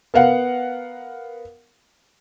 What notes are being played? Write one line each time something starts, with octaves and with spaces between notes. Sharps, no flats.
B3 A#4 F5 F#5